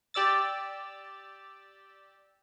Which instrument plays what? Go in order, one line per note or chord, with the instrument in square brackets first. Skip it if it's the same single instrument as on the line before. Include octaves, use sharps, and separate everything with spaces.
[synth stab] G4 D5 E6 A6